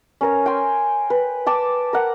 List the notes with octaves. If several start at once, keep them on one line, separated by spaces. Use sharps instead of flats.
C#4 A#4 C#5
G5 G#5 C6
B4
G5 A5 D6
A#4 F#5